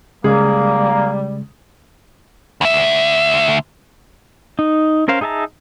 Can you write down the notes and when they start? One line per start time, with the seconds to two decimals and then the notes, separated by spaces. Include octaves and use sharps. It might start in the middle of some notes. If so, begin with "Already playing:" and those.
0.24 C#3 G3 G#3 A#3 G#4
2.61 D2 E5
4.59 D#4
5.08 C#4 A#4 C5 F5
5.21 D#4 G#4 E5 A5 A#5